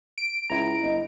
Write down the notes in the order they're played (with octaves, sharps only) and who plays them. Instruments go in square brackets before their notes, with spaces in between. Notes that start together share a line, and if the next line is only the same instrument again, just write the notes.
[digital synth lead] D7
[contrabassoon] C#2 [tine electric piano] E4 A#5
[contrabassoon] G1 [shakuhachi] D#5